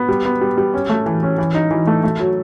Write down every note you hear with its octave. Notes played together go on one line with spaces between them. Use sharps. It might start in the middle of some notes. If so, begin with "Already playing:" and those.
Already playing: B3
G3
B3
G3
G3
C#4
A3
E3
C#4
E3
D#4
E3
A3
A3
F#3